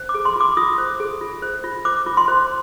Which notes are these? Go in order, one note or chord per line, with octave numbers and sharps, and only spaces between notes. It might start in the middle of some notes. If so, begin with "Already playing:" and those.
Already playing: C5
D6
G#4
C6
F4 D6
F4 D#6
C5
G#4
F4
C5
F4
C5 D6
F4
C6
C5